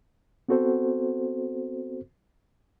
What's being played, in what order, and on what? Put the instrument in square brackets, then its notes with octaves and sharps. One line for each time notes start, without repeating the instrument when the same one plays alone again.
[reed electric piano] B3 C4 F#4 A4 C5